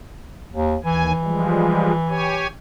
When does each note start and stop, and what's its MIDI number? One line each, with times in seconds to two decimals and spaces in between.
0.52 0.76 39
0.84 1.12 39
0.84 2.52 52
0.84 1.12 80
1.24 1.93 53
1.24 1.93 55
1.24 1.93 56
2.09 2.47 67
2.09 2.47 73
2.09 2.47 80